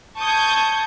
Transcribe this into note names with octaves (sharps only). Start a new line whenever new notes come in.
A5 C#6 D#6 G6 G#6